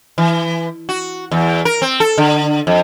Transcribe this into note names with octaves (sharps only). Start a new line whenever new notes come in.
E3
F#4
E2
A#4
C4
A4
D3
F2